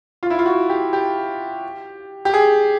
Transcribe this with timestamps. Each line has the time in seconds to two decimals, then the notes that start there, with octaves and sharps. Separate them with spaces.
0.23 F4
0.30 E4
0.39 F4
0.46 F#4
0.69 G4
0.93 G4
2.25 G4
2.34 G#4